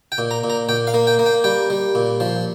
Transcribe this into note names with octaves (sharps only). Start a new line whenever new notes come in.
G5
A#2
A#5
A#2
A#5
A#2 G5
F5
A#3
G5
A#3
G5
G3 G5
G3
A#2
F3